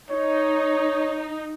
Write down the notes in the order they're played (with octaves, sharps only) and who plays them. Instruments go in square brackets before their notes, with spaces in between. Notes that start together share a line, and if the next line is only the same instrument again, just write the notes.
[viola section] D#4 [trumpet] C#5